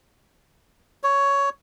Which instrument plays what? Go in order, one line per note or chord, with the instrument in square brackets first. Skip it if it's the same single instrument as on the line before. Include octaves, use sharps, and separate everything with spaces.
[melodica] C#5